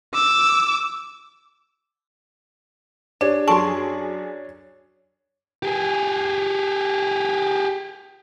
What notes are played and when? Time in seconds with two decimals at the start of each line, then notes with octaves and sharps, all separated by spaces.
0.13 D6 E6
3.21 D4 G4 G#4 C#5
3.48 F#2 F#3 G#4 A4 A5 C6 C#6 D7
5.63 G4 G#4